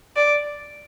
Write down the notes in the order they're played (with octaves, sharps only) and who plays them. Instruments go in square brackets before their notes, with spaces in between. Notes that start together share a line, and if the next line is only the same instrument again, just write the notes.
[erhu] D5